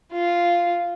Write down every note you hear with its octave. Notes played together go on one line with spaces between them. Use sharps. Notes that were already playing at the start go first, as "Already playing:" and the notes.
F4